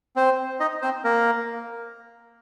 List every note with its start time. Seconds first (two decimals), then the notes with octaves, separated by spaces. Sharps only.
0.16 C4 C5
0.60 D#4 D#5
0.82 C4 C5
1.04 A#3 A#4